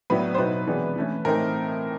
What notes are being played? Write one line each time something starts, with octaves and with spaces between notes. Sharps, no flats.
A2 F#3 B3 D4 B4
C5
B2 F#3 B3 D#4 B4
C3 E3 G#3 B3 D4
E3 A3 C#4
A2 E3 A3 C4 D#4 A#4